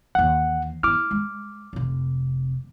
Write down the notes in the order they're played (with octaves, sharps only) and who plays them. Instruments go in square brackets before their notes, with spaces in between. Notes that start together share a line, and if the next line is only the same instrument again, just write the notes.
[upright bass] D#2 E3 [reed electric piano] F#5
[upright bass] B3 E4 [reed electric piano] D6 F6
[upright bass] G#3
F1 C3